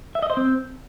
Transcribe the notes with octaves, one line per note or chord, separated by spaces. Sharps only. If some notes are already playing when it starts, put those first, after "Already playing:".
E5
D#5
C5
C4